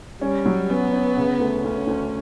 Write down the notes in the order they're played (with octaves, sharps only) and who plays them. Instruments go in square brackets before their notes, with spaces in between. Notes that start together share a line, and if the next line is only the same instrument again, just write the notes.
[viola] G3 [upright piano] C#4
[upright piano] F#3
[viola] B3 [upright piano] C#4
[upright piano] C#4
C#3
D2
[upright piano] D2 [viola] C#4
[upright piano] D2